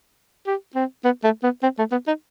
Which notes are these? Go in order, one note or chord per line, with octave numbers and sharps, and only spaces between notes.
G4
C4
B3
A3
B3
C4
A3
B3
D#4